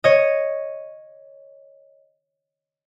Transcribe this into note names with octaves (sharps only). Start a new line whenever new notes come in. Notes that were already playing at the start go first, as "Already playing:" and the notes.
C#5 D#5